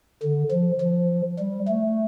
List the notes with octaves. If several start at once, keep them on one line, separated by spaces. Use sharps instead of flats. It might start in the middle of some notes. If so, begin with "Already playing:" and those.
D3
F3
F3
G3
A3